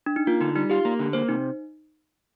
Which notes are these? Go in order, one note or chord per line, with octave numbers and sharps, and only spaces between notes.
D4
D#4
A#3 F4
D3 D#4
G3 D#4
F4 G4
A#3
D3
A#3 C5
C3 D#4